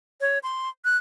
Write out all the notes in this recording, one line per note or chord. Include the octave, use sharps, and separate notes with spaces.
C#5
C6
F#6